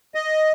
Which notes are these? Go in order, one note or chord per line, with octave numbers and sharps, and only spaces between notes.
D#5